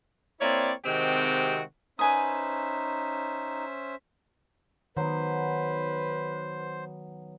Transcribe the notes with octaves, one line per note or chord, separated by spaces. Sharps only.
A#3 C4 E4 C#5 D5
C3 D#3 G#3 C4 F#4 G4
C#4 D#4 B4 C5 E5 G#5 D#6
D#3 F#3 B3 B4 C5